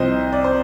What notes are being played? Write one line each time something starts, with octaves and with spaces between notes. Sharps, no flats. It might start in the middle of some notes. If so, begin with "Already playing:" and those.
Already playing: C2 C3 F3 C5 D#5
D5
C5